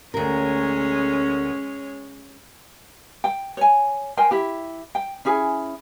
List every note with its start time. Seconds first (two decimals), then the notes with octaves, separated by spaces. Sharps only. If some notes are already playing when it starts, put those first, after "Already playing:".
0.14 D2 G#3 C#4 A#4 C#5
3.24 G5
3.57 C#5 G#5
4.17 A#4 C5 G5 G#5
4.31 E4 G4
4.95 G5
5.25 C#4 E4 G#4 G#5